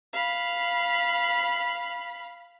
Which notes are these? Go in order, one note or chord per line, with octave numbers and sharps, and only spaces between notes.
F5 B5